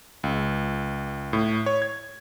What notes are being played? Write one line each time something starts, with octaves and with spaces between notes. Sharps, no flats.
C#2
A2
C#5
G#6